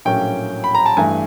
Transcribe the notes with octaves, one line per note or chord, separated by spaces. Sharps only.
A#1 A2 F#3 A#3 C#4 G5
B5
A#5
A5
G2 E3 A3 G#5